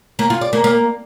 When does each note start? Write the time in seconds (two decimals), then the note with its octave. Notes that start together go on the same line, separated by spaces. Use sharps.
0.19 A#3
0.30 F4
0.41 D5
0.53 A#3
0.64 A#3